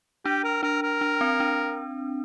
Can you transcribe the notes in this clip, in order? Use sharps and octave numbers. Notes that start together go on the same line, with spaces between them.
D4 G4
A#4
D4 A#4
A#4
D4
C4
D4